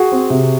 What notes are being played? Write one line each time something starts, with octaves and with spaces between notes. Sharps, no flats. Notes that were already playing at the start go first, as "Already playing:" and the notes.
Already playing: F#4 G#4
C4
C3